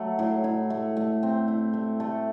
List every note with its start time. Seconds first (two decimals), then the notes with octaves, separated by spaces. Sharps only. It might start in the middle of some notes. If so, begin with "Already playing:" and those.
Already playing: F#3 A3
0.19 A2
0.44 E4
0.70 A3
0.97 A3
1.23 C4
1.48 E4
1.73 A3
2.00 A3